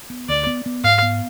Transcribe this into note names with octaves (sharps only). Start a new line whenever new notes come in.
B3
D2 D5
B3
B3
G#2 F5
B3